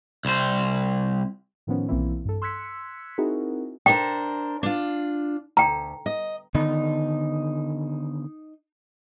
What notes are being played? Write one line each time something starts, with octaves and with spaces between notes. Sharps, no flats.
C2 C5
A2 D#3 F3 B3 C#4
B1 E3 A#3 C4 E4
G2 A4
C6 E6 F#6 G#6 B6 C#7
C4 D#4 E4 F#4 G#4 A#4
D4 A#4 C5 G5
D4 F4
D2 G5 A#5
D#5
D3 D#3 B3 D#4